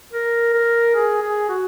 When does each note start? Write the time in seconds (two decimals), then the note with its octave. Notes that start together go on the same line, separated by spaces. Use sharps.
0.13 A#4
0.54 A#4
0.95 G#4
1.22 G#4
1.49 F#4